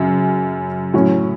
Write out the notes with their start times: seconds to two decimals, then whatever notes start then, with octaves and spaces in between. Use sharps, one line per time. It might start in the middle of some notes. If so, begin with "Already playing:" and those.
Already playing: F#2 C#3
0.94 A2 F#3 C#4